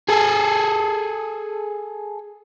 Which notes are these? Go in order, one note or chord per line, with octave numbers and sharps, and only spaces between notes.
G#4 A4